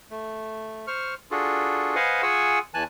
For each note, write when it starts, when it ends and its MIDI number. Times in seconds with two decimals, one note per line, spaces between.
0.11 0.86 57
0.87 1.14 72
0.87 1.14 85
0.87 1.14 89
1.31 1.95 62
1.31 1.95 65
1.31 1.95 66
1.31 1.95 68
1.31 1.95 69
1.95 2.22 71
1.95 2.22 72
1.95 2.22 75
1.95 2.22 77
1.95 2.22 78
1.95 2.22 80
2.23 2.59 65
2.23 2.59 68
2.23 2.59 78
2.23 2.59 80
2.23 2.59 85
2.23 2.59 88
2.74 2.84 40
2.74 2.84 52
2.74 2.84 80
2.74 2.84 81
2.74 2.84 90